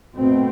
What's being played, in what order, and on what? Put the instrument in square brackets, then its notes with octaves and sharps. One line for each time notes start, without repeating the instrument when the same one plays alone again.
[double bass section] B2 A3 C4